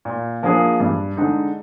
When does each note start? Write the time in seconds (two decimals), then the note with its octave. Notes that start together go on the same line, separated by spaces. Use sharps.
0.05 A#2
0.43 F3 A#3 D4 G#4
0.80 G2
1.17 D3 G#3 D#4